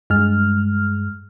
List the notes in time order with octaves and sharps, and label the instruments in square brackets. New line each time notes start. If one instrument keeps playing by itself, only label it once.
[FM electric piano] G2 G#3 F6